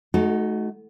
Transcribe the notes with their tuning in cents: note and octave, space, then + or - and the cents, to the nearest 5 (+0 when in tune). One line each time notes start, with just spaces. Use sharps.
A3 -35 D#4 +0 F#4 +0